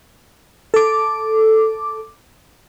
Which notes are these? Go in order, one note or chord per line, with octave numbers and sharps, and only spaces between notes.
A4 D6